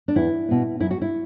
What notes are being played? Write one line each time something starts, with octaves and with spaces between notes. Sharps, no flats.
D4
E2 E4
B2 B3
F#2 E4
F#4
E4